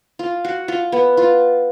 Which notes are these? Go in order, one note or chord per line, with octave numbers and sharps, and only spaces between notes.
F4
F#4
F4
B3
F4